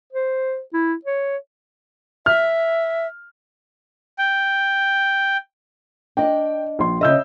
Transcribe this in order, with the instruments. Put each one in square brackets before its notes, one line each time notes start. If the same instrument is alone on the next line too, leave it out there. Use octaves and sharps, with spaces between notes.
[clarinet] C5
E4
C#5
[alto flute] E5 [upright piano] F6
[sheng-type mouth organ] G5
[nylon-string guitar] D4 D#5 [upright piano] G5
[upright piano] A#1 C6
[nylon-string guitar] C#3 D#5 [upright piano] E5 E6 G6